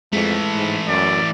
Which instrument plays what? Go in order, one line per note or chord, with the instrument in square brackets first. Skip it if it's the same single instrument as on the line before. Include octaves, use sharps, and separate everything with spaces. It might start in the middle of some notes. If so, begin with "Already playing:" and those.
[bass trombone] F2 [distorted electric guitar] E3 A3 [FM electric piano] G#3
[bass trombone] G#2
[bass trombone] F#2 [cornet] D5